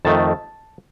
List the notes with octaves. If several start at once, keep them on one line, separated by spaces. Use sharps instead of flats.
F2 D#3 A3 A5